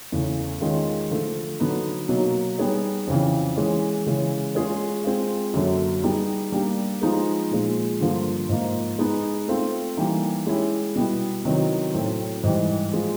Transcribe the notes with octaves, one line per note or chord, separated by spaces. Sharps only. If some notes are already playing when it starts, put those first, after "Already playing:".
E2 C#3 E3 A3
D#3 G#3 C#4 F4
D3 F3 A3
D3 F#3 B3 D#4
B2 F#3 A#3
G3 B3 D#4 G#4 C#5
F2 C#3 E3
E3 G#3 C#4
C#3 E3 G#3 C#4
G#3 C#4 F4 G#4 C#5
G#3 C4 F4
F#2 D3 F#3 A#3
G3 B3 D#4 G#4
G3 A#3 D4 G4
F3 G#3 B3 D#4 G#4
A#2 F3 G#3
G2 D3 F3 A#3
G#2 F3 A#3
G#3 B3 D#4
A3 C4 F4
E3 G3 A#3 D#4
G#3 C#4 E4 G4
B2 G3 B3 E4
C3 D#3 F#3 B3 E4
A2 F#3 A3 C4
G#2 E3 G3
F3 G#3